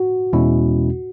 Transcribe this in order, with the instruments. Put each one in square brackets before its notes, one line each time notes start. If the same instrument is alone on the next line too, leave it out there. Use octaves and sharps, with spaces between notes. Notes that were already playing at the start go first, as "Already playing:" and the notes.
Already playing: [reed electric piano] F#4
[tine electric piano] E2 B2 G#3 C#4 E4